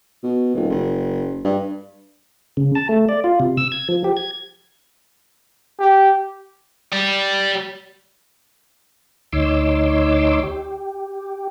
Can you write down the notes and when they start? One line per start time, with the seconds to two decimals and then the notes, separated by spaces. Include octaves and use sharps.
0.23 B2
0.55 D#1
0.70 F#1
1.45 G2
2.57 C#3
2.75 A5
2.89 A3
3.09 D5
3.24 F4
3.40 C3
3.57 E6
3.72 G#6
3.89 F3
4.04 G4
4.17 G#6
5.80 G4
6.93 G3
9.33 D2 D#4 C#5 C6 D6 E6
10.43 G4